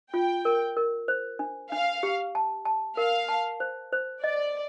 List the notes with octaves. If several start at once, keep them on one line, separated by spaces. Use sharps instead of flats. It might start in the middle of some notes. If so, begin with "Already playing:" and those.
F4 G5
A#4
A#4
C5
D4
D4 F5
G4
A5
A5
A#4 F5
A5
C5
C5
D5 D#5